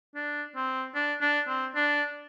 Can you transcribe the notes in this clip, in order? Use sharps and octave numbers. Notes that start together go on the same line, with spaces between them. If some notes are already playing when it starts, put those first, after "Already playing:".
D4
C4
D4
D4
C4
D4